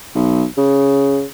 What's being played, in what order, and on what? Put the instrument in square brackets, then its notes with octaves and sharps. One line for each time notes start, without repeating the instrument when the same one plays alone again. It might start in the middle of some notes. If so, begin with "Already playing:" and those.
[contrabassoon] B1
C#3